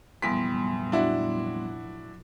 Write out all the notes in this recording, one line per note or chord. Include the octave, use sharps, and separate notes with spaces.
F1 E2 A#2 F#3 G3 B3 C6 B6
D4 E4 F#4